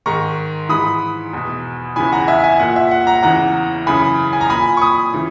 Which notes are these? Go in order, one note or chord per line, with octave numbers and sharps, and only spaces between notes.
G#2 D#3 A#5 C#6
G#2 E3 B5 D#6
E2 B2
E2 C#3 E3 G#5 B5
F#5 A#5
E5 G#5
E5 G#5
A#2 F#5
E5
F#5
F#5 A#5
E2 C#3 E3 F#5 A#5
F#2 C#3 E3 G#5 B5
G#5
A#5
A#2 G#5 B5
C#6
B5 D#6
C#3 E3